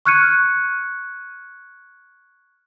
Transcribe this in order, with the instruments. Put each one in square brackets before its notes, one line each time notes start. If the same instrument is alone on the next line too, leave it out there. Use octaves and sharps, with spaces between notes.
[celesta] C#6 F6 F#6 G#6 C#7 D#7